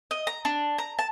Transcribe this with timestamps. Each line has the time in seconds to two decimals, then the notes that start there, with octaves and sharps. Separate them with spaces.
0.11 D#5
0.27 A#5
0.45 D4
0.78 A#5
0.99 A5